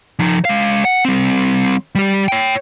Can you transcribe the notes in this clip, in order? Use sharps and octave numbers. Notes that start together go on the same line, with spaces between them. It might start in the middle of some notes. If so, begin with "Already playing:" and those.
F3 D#4
G#3 F5
F#5
G3 C4
G3 G4
C#5 G5